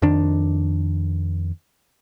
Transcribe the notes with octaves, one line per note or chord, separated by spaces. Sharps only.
F2 D#3 D4